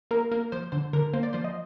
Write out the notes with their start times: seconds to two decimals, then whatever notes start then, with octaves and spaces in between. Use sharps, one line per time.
0.11 A#3 A#4
0.32 A#3 A#4
0.52 F3 C5
0.72 D3 C5
0.93 D3 A#4
1.13 A#3 C5
1.23 D5
1.33 F3 C5
1.44 D#5